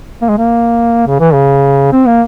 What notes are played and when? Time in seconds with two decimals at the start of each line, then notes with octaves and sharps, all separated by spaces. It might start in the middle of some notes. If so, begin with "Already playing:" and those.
0.22 A#3
0.29 G#3
0.38 A#3
1.07 C#3
1.20 E3
1.34 C#3
1.92 C4
2.07 A#3